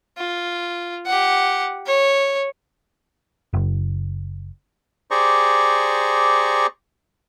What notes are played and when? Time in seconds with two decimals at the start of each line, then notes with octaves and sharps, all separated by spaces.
0.17 F4
1.06 G4 F#5
1.86 C#5
3.53 F#1
5.11 G4 G#4 C5 D5 A#5 C#6